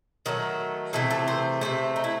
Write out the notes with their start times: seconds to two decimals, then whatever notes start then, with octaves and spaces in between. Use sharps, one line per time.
0.26 D#3 F#3 A3
0.93 C3 E3 A3 G#4
1.11 A4
1.28 C5
1.61 C3 F#3 A3 C5
1.96 D#4
2.04 E4